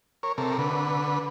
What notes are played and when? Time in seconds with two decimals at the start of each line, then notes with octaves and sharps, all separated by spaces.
0.23 A#4 C#5
0.38 C3 A4 A#4
0.59 D3 B4